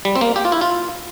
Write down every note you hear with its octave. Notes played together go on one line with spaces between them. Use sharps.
G3
C4
A#3
G4
F4
E4
F4